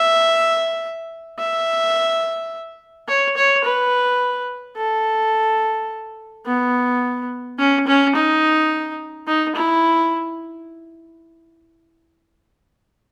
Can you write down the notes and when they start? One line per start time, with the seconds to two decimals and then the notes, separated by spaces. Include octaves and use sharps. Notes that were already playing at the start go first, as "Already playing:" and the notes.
Already playing: E5
1.39 E5
3.08 C#5
3.37 C#5
3.64 B4
4.76 A4
6.46 B3
7.58 C#4
7.87 C#4
8.15 D#4
9.27 D#4
9.55 E4